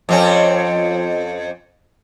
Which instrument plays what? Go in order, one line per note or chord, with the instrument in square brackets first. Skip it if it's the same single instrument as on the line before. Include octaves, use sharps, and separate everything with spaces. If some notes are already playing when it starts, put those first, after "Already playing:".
[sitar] F2 C4 C#4